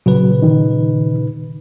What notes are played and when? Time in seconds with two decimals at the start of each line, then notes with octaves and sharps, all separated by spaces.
0.06 A#2 C#3 F#3 B4
0.42 D#3 D#4